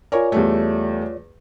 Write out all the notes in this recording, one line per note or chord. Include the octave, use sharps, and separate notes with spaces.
F4 A#4 C#5 D5 G#5
E2 G3 A3